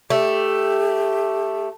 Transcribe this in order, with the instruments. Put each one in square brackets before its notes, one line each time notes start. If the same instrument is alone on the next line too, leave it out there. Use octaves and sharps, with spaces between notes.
[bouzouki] A3 [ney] G4